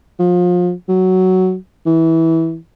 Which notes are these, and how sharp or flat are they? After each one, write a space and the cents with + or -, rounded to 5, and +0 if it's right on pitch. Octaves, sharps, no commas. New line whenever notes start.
F3 +30
F#3 +10
E3 -15